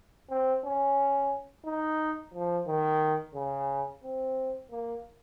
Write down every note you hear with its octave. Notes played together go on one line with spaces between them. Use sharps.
C4
C#4
D#4
F3
D#3
C#3
C4
A#3